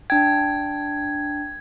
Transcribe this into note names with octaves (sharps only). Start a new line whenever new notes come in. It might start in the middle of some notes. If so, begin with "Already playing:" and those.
D4 G5 G#6